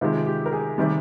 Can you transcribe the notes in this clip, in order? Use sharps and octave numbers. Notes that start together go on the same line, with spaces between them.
C3 D#3 G#3 F4
G4
A#4
G#4
C3 D#3 G3